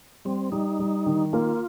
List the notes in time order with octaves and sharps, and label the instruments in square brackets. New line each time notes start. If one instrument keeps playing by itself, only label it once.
[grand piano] G3 [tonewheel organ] C4
[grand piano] G3 [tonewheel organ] D#4
[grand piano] G3
D#3
[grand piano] A#3 [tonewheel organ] F4